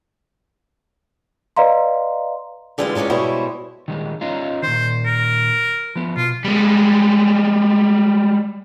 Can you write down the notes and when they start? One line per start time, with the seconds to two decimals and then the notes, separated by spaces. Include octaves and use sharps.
1.57 B4 D5 D#5 F5 A#5 C6
2.78 D3 E3 G3 G#3 C4 F4
2.95 C3 G#3 C#4 F4 D5
3.10 B2 G3 G#3 E4 C5 C#5
3.88 D#3 G3 G#3
4.21 C#4 D#4 F4
4.62 A#2 D#3 C5
5.05 A#4
5.96 F3 B3
6.16 B2 F4
6.45 G3 G#3